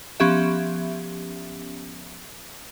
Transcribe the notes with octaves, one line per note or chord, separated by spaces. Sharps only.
F3 B3 C#4 G4 E5